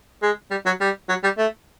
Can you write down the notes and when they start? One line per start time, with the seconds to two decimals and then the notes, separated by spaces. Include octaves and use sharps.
0.22 G#3
0.51 G3
0.66 F#3
0.80 G3
1.09 F#3
1.23 G3
1.37 A3